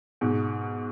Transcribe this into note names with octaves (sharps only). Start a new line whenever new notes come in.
G#2 B2